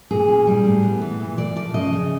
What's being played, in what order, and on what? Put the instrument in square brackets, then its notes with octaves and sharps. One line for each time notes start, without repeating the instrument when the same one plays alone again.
[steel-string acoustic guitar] A#2 G#4
C#4
G3
A2
B3
E3
A#2
A#2 D5
F3 D5
C#3 D#5
C#3